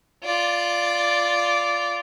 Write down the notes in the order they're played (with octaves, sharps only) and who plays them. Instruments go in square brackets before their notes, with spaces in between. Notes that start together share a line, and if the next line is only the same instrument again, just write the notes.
[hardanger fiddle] F4 D5